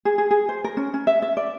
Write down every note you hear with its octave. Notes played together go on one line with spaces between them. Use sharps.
G#4
G#4
G#4
C5
A#4
C#4
C#4
E5
E5
D5